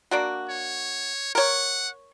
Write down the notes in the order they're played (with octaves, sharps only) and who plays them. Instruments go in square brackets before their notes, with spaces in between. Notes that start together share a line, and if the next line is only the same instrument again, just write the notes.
[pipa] A#3 D4 F#4
[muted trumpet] C#5
[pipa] A#4 C#5 [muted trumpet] F#5